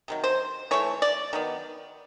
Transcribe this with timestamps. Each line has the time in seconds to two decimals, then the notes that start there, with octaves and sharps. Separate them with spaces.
0.08 C3 D#3 F#3
0.24 C5
0.71 E3 A3 C#5
1.02 D5
1.33 D#3 F#3 B3